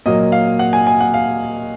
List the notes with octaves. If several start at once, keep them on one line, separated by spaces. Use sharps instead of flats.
A#2 F#3 A#3 D#5
F5
F#5
G#5
G#5
F#5
F5